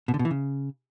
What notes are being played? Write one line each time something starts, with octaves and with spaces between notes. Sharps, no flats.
B2
D3
B2
E3
C#3